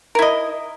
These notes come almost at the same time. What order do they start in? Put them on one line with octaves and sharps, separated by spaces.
A#4 E4 D#5